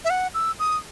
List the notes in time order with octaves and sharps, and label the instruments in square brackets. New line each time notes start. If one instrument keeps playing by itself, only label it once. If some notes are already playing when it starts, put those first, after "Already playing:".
[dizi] E5
F#5
E6
D#6